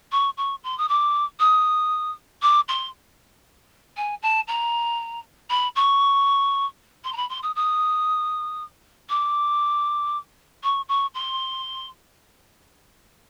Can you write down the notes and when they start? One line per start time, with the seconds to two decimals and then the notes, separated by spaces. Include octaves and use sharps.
0.12 C#6
0.37 C#6
0.63 C6
0.77 D#6
0.88 D6
1.39 D#6
2.42 D6
2.68 C6
3.96 G#5
4.22 A5
4.47 A#5
5.50 B5
5.75 C#6
7.04 C6
7.12 A#5
7.16 B5
7.29 C6
7.43 D#6
7.55 D#6
9.09 D6
10.63 C#6
10.88 C#6
11.14 C6